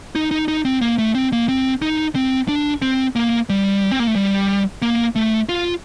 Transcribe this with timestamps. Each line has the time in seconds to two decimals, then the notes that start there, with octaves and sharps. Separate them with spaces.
0.15 D#4
0.31 D#4
0.48 D#4
0.65 C4
0.81 A#3
0.98 A3
1.15 C4
1.32 A#3
1.49 C4
1.82 D#4
2.15 C4
2.48 D4
2.82 C4
3.16 A#3
3.49 G3
3.91 C4
4.00 A#3
4.07 A3
4.15 G3
4.82 A#3
5.16 A3
5.49 F4